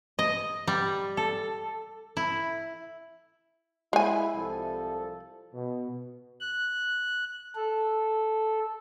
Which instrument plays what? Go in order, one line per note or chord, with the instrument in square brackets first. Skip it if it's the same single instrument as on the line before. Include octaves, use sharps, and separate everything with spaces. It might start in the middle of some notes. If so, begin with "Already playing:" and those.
[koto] D#5
G3
A4
E4
[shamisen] G#3 G#5 [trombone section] E4
[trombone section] C2 F3 A4
B2
[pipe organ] F#6
A4